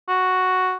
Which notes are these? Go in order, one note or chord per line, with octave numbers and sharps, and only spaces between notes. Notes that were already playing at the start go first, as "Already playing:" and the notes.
F#4